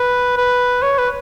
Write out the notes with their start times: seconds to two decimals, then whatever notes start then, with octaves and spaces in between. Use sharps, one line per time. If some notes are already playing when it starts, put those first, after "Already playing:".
Already playing: B4
0.37 B4
0.83 C#5
0.98 B4